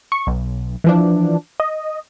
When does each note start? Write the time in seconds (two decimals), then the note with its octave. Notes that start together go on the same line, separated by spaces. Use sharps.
0.12 C#6
0.27 B1
0.84 E3 F3 D4
1.60 D#5